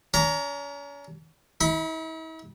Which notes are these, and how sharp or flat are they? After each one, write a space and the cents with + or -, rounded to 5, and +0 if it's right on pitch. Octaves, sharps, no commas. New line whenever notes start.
C#4 +40 A#5 +0
E4 -45 B5 +0